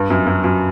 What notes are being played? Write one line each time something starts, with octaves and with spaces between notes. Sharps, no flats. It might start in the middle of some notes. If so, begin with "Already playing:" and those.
Already playing: G2
F#2
F#2
F#2